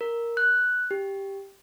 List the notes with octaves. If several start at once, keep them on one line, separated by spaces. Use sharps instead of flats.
A#4
F#6
G4